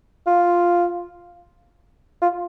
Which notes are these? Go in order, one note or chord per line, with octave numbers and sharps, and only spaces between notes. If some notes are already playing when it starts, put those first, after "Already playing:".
F4
F4